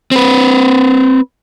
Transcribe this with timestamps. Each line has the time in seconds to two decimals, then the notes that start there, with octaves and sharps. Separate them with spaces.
0.11 C4 B4